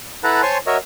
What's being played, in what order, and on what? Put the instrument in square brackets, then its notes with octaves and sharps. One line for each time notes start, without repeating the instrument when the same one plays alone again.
[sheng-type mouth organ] E4 A4 B4 F#5 A5 A#5
C5 C#5 G#5 A5 C6 C#6
F#4 A#4 C#5 D#5 E5